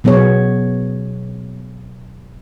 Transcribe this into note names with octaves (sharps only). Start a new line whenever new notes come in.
B2 F#3 B3 G#4 C#5